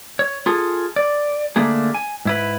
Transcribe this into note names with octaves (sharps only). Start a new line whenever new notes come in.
C#5
F4 G#4 A4
D5
D3 A3 A#3 G#4
G#5
G#2 E4 B4